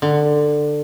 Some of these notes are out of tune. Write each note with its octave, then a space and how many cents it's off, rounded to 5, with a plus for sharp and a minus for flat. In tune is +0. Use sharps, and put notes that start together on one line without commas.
D3 +15